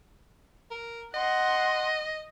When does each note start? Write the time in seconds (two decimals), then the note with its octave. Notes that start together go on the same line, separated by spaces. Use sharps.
0.71 A#4
1.14 D#5 F#5 C6